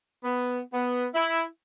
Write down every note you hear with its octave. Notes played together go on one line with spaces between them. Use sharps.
B3
B3
E4